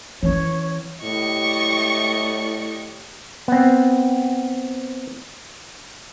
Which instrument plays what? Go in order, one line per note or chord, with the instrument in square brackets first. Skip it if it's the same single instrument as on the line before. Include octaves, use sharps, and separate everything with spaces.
[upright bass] E3 C#4 [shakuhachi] C#5
[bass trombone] A2 [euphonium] E4 [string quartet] G4 D5 D#5 [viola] C#6
[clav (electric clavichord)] B3 C4